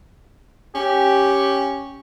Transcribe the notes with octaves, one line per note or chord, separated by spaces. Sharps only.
C#4 G4